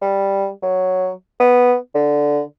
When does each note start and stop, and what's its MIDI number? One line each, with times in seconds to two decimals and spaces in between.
0.02 0.49 55
0.62 1.12 54
1.40 1.75 59
1.95 2.41 50